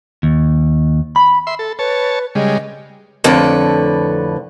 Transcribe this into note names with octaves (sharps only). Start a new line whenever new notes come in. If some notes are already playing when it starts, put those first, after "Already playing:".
D#2
B5
E5 C6
A4
B4 C#5 A5
C#3 G3 G#3 D#5
F2 A2 D3 B4